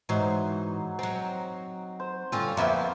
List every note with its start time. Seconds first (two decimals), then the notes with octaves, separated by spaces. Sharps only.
0.09 G#2 E3 F#3 D#4 C5
0.99 F#3 C4 A#5
2.00 C5
2.32 G2 D3 C4 C#4 F4
2.57 F2 A#3 B3 C5 E5